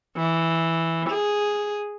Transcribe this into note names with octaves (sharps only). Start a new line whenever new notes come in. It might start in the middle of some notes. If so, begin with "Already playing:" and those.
E3
G#4